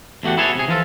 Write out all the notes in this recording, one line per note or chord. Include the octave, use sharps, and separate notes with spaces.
E2 A3 F#4 G4 F#5
E4 F#4 G#4 A4 B4 C#5
C3 G#4
E3 F3 F4 A4